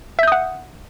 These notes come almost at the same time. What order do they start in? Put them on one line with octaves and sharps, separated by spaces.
E5 G6 D#6 F#5